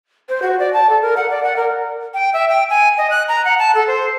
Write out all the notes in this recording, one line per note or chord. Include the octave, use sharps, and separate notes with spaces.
C5
F#4
D5
A5
A4
A#4
F#5
D5
F#5
A#4
G5
E5
G5
G#5
D#5
F#6
A#5
F#5
A5
A4
C5